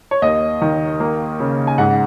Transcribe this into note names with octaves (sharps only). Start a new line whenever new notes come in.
C#5
D#2 D#5
D#3
A#3
C#3
G#5
G#2 F#5